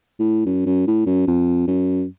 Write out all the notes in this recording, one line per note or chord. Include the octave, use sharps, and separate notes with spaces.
A2
F#2
F#2
A2
F#2
F2
F#2